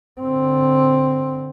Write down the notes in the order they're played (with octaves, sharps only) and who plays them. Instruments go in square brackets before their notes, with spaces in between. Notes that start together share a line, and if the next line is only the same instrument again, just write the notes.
[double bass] D3 C4